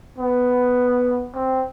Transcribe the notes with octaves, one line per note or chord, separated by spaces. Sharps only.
B3
C4